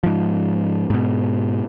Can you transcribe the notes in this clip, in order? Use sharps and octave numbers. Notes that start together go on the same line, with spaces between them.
G#2 F3
G#2 B2